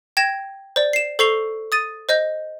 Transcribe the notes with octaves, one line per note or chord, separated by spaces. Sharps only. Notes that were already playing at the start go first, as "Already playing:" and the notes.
G5 G#6 A#6 E7
C5 D5
C7 E7
A4 C5 C#6 C7 F7 G7
D#6 A6 D#7
C5 D#5 G6